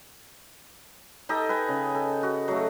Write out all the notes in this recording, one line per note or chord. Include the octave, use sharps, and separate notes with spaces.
D#4 G4 A4 D#5
B4 G5 G#5
C#3
A4
F#4
F#3 A3